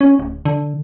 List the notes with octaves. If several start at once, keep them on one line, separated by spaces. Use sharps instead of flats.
C#4
D1
D3